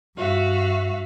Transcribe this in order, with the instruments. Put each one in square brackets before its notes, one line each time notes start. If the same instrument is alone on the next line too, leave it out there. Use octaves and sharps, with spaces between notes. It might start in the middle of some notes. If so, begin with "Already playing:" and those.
[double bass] G2 [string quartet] F#4 E5 F5